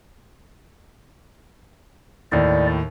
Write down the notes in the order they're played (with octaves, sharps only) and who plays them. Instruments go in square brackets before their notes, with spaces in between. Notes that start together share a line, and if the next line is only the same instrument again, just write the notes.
[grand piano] D#2 A2 [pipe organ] D5